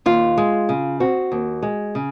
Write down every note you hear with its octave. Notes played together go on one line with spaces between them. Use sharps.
D#2 F4
G#3
C#3
C4 F#4
D#2
G#3
C#3